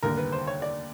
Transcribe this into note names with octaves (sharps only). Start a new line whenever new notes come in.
F1 D#2 D3 G3 A#3 A#4
B4
C5
C#5
D5